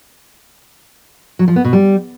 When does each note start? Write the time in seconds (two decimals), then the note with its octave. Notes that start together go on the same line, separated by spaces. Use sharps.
1.39 F#3
1.48 F3
1.56 B3
1.64 B2
1.73 G3